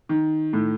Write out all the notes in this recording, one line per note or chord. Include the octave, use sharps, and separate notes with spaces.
D#3
A2